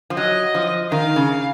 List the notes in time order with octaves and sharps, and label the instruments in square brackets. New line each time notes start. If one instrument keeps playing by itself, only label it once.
[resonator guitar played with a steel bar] F3
[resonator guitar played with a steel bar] F#3 [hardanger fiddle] D#5
[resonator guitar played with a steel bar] F3
[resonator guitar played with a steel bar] D#3 [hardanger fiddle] F5
[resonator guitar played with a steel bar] C#3